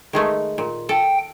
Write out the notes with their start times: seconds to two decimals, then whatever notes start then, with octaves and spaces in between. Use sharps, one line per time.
0.13 D#3 G#3 A3
0.58 A#2
0.89 A4 G5